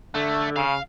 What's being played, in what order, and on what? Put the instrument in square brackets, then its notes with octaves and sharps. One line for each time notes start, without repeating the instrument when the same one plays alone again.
[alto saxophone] D3 [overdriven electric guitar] A3
[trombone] C#3 [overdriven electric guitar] F5